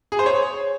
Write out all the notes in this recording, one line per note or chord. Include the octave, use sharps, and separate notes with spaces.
G#4
C5
C#5